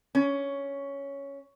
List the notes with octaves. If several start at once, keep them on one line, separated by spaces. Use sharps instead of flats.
C#4